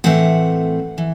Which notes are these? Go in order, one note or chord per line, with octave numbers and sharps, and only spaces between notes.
A2 E3 A3 C4 F#5
E3